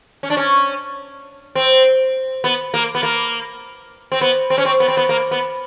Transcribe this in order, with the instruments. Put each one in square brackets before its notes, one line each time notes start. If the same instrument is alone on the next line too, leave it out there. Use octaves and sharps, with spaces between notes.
[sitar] C#4
D4
C#4
C4
B3
A#3
B3
A#3
C4
B3
C4
C#4
C4
B3
C4
B3
A#3
B3